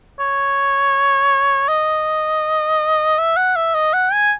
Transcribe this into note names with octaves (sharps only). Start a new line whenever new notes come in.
C#5
D#5
E5
F#5
E5
D#5
F#5
G#5